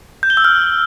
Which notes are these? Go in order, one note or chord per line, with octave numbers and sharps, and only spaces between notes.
G6
G7
E6
F6